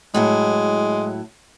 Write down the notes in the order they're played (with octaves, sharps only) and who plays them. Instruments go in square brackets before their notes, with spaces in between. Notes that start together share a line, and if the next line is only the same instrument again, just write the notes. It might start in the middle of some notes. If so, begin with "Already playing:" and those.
[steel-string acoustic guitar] A2 F#3 E4 [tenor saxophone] G#3